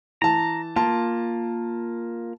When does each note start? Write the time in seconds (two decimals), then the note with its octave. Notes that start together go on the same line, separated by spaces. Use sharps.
0.22 E3 A5 A#5
0.76 A#3 F4 A5